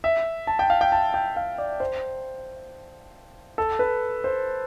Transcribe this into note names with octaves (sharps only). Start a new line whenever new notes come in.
E5
A5
G5
F5
G5
A5
G5
F5
D5
C5
A4
B4
C5